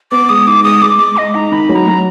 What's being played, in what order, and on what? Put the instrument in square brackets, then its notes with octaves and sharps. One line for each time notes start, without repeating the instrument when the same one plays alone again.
[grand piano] B3 [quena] D6
[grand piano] G#3 [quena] D#6
[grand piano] D#4 [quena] D6
[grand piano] G#3 [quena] D#6
[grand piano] G#3 [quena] D6
[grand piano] G#3 [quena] D6
[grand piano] G#3 [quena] D#5
[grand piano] D#4 [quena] A#5
[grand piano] D#3 [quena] B5
[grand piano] F#3
[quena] A#5
[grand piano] F#3